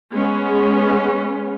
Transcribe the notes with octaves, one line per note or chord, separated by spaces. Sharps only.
G#3 B3 C#4